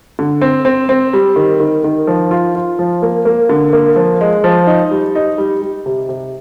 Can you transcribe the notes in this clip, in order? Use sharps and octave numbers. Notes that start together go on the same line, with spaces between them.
D3
C4
C4
C4
G3
D#3
D#3
D#3
F3
F4
F4
F3
A#3
A#3
D3
A#3
F3
G#3
F3
D#4
G3
D#4
G3
G3
C3
C3